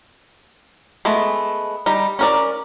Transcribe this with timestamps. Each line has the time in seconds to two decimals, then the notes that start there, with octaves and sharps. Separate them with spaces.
1.05 G#3 A3 B3
1.86 G3 D#4
2.19 C#4 A#4 D5